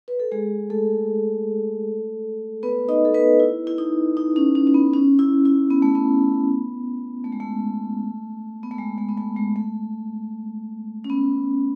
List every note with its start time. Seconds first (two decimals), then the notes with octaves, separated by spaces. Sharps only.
0.08 B4
0.20 A4
0.32 G#3 G#4
0.70 A3 A4
2.63 B3 B4
2.89 D#4 D#5
3.05 A4
3.14 B3 B4
3.40 E4
3.67 E4
3.78 D#4
4.17 D#4
4.36 C#4
4.55 C#4
4.67 C#4
4.74 B3
4.94 C#4
5.19 E4
5.45 E4
5.71 B3
5.82 A3
5.95 B3
7.24 A3
7.32 G#3
7.40 A3
8.63 B3
8.71 A3
8.78 G#3
8.98 A3
9.09 B3
9.17 A3
9.36 G#3
9.56 A3
11.04 C#4
11.10 B3